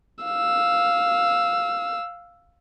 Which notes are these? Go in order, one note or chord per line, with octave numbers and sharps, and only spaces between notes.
F5 E6